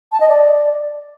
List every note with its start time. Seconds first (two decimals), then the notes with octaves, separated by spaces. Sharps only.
0.12 A5
0.20 D#5
0.29 D5